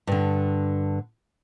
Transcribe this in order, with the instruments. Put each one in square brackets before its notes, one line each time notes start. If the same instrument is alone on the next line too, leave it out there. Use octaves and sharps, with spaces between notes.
[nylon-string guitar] G2 D3